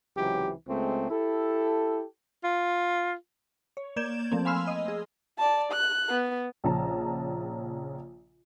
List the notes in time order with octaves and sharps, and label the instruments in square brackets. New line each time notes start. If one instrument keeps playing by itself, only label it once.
[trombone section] C#2 C3 E3 F#3 G4
C#2 G#3 A3 C4
E4 G4 A4
[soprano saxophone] F4
[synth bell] C#5
A#3 D5 G6 G#6 E7
F3 A3 A#3 C4
F5 G#5 B5 C6 E6 F6
D#5
G#4
[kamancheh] D5 A5
F#6
B3
[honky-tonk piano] A#1 C#3 A5 A#5